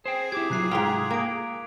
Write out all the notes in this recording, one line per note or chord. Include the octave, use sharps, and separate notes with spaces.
G#4 C5 G5
E4 G4 D6 D#6 G#6
C3 F#3 F4 A#5 F#6 C7
G#2 F4 G5 A#5 B6 F7
A#3 G#6 D7